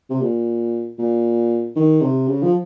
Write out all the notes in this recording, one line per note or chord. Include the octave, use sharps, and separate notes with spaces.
C3
A#2
A#2
D#3
C3
C#3
F3